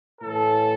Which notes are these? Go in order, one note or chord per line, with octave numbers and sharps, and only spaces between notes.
A2 E3 A4